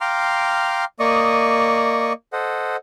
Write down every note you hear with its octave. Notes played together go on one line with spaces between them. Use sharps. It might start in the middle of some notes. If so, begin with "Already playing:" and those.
F5 G5 A#5 C6 D6 F6
A#3 D5 D#5 C#6 D#6
A4 C5 D#5 F#5